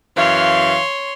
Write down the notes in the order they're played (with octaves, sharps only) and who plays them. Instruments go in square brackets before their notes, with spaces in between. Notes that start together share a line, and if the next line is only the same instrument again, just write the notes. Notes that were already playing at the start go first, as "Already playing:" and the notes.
[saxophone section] F#2 E3 F5 [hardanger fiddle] C#5 C6